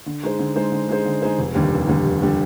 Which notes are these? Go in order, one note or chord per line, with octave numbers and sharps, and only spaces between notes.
D3
G#3 D#4 G#4 C5
D3
G#3 D#4 G#4 C5
D3
G#3 D#4 G#4 C5
D3
G#3 D#4 G#4 C5
F1
D#2 D3 G3
F1
D#2 D3 G3
F1
D3 G3